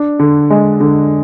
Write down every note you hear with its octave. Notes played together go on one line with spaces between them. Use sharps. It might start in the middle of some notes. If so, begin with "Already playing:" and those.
Already playing: D4
D3
G#3
D3